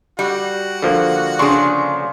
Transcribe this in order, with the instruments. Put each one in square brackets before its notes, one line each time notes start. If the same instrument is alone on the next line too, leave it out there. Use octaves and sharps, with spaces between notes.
[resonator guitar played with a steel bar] G3 [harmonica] F#4
[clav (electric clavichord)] D3 F3 A#3
[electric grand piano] C#3 C6 C#6 [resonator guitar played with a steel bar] D4 G#4